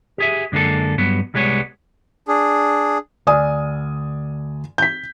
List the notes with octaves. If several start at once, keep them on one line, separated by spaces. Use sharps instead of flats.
G4 G#4 E5
F#2 D3 G#3 A#3 A4
G2 F#3 B3
C2 G3 G#3 B3 C#5
D4 G#4
D2 D5 G#5 D#6
G6 B6